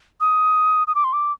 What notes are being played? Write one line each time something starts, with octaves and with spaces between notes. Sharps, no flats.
D#6
D#6
D6
C6
D6